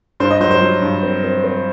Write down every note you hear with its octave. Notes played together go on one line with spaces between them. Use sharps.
G2 C5
D#5
F#3 C5
C5
F#3
G2
C4
C4
C4